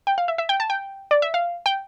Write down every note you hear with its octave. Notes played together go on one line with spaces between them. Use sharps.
G5
F5
E5
E5
G5
A5
G5
D5
E5
F5
G5